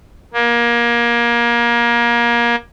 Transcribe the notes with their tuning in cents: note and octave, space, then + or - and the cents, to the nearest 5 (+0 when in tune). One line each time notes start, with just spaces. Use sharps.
A#3 +25